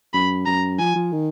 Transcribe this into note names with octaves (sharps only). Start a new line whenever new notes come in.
F#2 B5
F#2 A#5
F3 G#5
F3
D#3